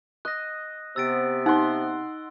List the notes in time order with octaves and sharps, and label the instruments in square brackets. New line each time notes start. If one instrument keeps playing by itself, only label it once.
[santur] D#5 [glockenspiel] F#6 A#6
[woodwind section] C3 B3 [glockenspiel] E6 A6 D7
[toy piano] D#4 [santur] F#5 C6